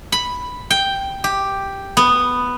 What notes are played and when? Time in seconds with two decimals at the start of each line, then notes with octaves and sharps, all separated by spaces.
0.12 B5
0.70 G5
1.24 G4
1.97 B3